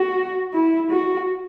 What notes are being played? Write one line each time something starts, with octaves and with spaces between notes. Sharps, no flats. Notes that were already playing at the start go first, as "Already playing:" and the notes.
Already playing: F#4
E4
F#4